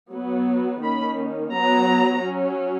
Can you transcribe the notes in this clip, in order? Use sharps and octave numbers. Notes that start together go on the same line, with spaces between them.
F#3 B3
D#3 A#3 C#4 B5
F#3 B3 A#5
F#3 C#4